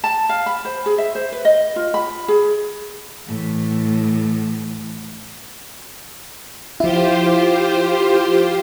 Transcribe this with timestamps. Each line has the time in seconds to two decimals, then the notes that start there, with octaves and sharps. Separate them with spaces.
0.04 A5
0.29 F5
0.46 B5
0.65 C5
0.86 G#4
0.98 E5
1.15 C5
1.32 B4
1.45 D#5
1.76 F4
1.94 B5
2.28 G#4
3.27 A2 E3
6.80 F3 E4 F4 G4 C5